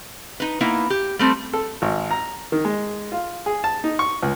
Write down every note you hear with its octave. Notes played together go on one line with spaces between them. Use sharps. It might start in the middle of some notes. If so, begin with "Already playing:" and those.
D#4 B4
A#3 B3 D#4 E4
G4
G3 A3 C4
A4
G#1
A#5
D#3
G#3
F4
G#4
A5
D#4
C#6
C#2